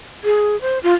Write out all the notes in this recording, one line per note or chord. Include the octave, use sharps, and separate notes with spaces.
G#4
C5
F4